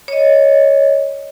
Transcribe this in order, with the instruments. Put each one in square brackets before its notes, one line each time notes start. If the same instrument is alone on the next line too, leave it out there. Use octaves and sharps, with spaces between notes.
[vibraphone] C#5 D#5